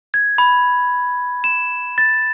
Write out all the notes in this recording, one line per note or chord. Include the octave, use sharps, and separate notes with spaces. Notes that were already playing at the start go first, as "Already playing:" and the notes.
G#6
B5
E7
A6